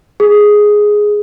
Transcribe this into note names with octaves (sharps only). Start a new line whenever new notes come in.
G#4